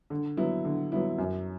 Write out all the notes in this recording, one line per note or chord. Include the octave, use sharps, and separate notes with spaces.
D3
F#3 B3 E4
D3
F#3 B3 E4
F#2